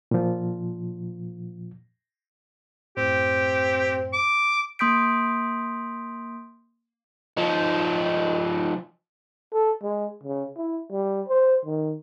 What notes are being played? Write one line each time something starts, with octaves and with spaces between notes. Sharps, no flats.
A#2 F3
F#2 A2 C4 G4
D6
A#3 C6 D#6 G6 B6 D7
F3 D#4
A4
G#3
C#3
E4
G3
C5
D#3